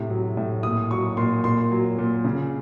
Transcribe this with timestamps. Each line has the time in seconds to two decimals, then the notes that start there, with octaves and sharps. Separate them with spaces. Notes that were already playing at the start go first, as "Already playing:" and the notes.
Already playing: A2 C3
0.10 F#3
0.37 A2
0.63 A#2 D#6
0.91 F#3 C#6
1.17 A#2 C6
1.44 A#2 C6
1.71 F#3
1.98 A#2
2.24 C#3